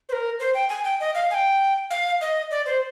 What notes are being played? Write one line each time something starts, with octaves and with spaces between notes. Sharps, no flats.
C5
A#4
C5
G5
G#5
G5
D#5
F5
G#5
G5
F5
D#5
D5
C5